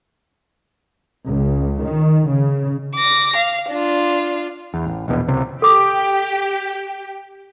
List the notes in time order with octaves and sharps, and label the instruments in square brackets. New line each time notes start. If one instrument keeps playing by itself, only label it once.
[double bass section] C#2
D#3
C#3
[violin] D6 A#6
F5
D4 F4
[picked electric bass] E2
A1
A#1 E2 B2
C#2 C3
[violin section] G4 [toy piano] A4 D6